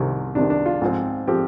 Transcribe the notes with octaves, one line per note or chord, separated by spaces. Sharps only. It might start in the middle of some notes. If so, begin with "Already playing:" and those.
Already playing: C2 C3 D#3
C2 C3 D#3 D4
D4
F4
G#2 F3 C4
F3 C4 G4